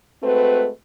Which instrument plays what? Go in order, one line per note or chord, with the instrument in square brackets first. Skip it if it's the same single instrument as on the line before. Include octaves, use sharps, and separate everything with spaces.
[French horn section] G#3 A3 C4 F#4 B4